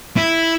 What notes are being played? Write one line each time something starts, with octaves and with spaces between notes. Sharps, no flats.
E4